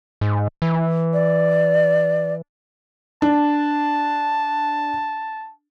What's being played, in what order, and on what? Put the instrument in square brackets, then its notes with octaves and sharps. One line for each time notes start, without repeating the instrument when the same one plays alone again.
[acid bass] G#2
E3
[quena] D5
[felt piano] D4 [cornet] A5